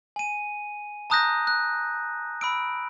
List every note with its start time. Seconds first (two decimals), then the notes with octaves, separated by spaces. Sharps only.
0.16 G#5 D#7
1.10 A5 A#5 D#6 F#6 G6 A#6
1.47 F#6
2.41 B5 E6 D7